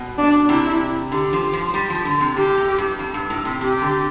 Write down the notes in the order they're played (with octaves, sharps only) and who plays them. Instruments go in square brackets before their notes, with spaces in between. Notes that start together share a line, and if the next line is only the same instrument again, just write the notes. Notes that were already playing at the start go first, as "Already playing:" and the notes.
Already playing: [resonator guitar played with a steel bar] B2
[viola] D4
[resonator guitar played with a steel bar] C3 [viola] E4
[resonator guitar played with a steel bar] D3 [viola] G4
[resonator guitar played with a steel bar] F3
F3
G3
F3
D3
C3
[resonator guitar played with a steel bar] A2 [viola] G4
[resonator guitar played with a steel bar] A2
G2
F2
G2
A2
C3
[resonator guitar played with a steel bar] C3 [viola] G4
[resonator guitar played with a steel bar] D3